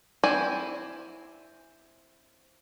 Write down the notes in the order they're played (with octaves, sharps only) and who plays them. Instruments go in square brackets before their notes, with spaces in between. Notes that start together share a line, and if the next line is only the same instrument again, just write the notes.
[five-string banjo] C4 E4 D5 G#5